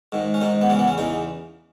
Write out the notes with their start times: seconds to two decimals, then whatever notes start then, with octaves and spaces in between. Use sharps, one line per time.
0.12 G#2 D#3
0.34 C#4
0.41 G#2 D#3 D#4
0.61 B3
0.70 E2 C#3 E3 C#4
0.79 B3
0.87 C#4
0.98 E2 C#3 E3 D#4